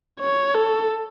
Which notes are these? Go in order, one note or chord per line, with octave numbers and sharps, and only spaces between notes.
C#5
A4